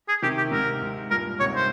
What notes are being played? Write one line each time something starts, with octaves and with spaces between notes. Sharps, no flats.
G#4
C3 D#3 G4
G4
G#2 C3 A#4
G#2
G2 A#2 A#4
G#2 C3 C#5
C5